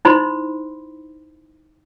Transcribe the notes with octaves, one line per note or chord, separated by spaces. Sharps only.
D#4 E4 C5 B5 C6